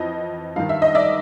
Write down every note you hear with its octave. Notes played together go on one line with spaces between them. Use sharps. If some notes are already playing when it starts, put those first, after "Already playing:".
Already playing: F2 E3 D#5
G2 D#3 F5
E5
D#5
D5 E5